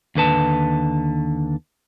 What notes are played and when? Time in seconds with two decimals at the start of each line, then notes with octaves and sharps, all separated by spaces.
0.15 D#2 D3 B4 A5